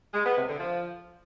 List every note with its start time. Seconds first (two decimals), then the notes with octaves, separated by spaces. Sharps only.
0.13 G#3
0.24 B3
0.36 C3
0.47 D3
0.58 F3